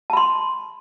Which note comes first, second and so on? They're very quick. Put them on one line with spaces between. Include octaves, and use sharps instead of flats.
A5 B5 C6